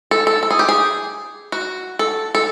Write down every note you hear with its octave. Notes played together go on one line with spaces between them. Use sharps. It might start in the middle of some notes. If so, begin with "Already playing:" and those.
A4
A4
A4
G#4
G4
G#4
F#4
A4
A4